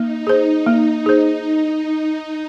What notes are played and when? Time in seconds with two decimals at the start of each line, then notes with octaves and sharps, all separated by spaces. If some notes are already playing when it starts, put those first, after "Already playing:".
Already playing: A#3 D#4
0.27 G#4 C5
0.66 A#3
1.06 G#4 C5